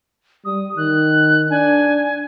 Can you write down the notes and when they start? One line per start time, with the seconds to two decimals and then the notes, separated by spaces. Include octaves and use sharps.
0.45 G3 D#6
0.77 D#3 F#6
1.50 D4 G#5